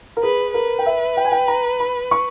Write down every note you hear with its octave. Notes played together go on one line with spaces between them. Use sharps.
A#4
G#4 B4
A#4 B4
G5
E5
G5
G#5
G5
A#5
B5
C#6